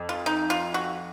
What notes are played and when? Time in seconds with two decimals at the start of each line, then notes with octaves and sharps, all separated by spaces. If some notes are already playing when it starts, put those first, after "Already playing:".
Already playing: F2
0.09 F4
0.26 D#4
0.50 F4
0.74 F#4